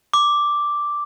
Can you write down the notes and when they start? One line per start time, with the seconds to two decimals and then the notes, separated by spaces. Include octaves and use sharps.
0.14 D6